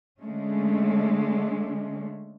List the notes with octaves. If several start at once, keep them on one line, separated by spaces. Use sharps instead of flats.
D3 G#3 A3 C#4